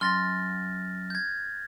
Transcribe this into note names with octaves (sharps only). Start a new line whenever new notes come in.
F#2 C6 F6 A6 A#6
G6 G#6